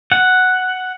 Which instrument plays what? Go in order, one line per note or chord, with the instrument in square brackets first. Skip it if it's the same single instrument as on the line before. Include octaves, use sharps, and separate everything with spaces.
[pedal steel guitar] F#5